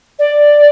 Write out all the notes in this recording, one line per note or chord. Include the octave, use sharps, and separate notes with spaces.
D5